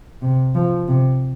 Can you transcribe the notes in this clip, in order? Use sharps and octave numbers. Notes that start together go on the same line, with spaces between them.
C3
F3
C3